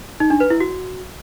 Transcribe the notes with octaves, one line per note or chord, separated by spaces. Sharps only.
D#4
D4
B4
E4
F#4